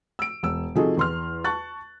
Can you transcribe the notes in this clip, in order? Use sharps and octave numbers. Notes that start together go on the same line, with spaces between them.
E6 D7
E1 E6
C3 F3 D#4 F#4 G#4 A4
E2 C6 F6
A5 C#6 F#6 A6